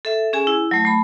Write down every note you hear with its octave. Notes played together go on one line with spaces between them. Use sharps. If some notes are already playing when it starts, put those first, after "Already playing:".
A4 E5
C#4 G#4 G#5
E4
F#3 A3
A3 B5